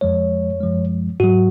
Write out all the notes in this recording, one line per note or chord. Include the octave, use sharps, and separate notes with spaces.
F2 F3 G#3 C#5
F#2 F3 G#3
G#2 F#3 F#4